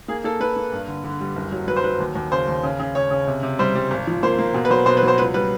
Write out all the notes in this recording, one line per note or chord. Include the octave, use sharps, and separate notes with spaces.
A#3 G#4
A#3 A4
A#3 B4
A#3
G2
D3
D3
G3
F#1
F#3
F#3 B4
C5
F#3 B4
D#2
D#2
C#3 C5
D#2
C#3
C#3
C#3 C#5
C#3
C3
C3
G3 C5
G3
G#1
F3
A#3 C5
A#3
B2
B4
F#3 C5
B2 C5
B4
F#3
C5
C#2 B4
G3 B4